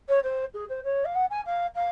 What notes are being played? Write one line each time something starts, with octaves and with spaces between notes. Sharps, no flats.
C#5
C5
G#4
C5
C#5
F5
F#5
G#5
F5
F5